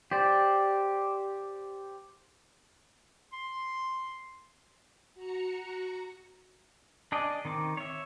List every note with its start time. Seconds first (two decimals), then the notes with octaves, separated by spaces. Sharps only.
0.11 G4 C5 D5
3.33 C6
5.15 F#4 A#5 C#7
7.12 D4 G#4 D5 D#5
7.45 D#3 C4 D#4 D6
7.77 C#5 E5